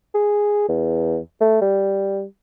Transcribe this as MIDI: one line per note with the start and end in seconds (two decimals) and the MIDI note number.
0.15 0.64 68
0.69 1.19 40
1.41 1.60 57
1.62 2.24 55